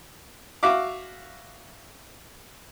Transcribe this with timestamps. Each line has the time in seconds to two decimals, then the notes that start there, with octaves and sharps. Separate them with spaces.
0.63 F#4 E5 F5 D6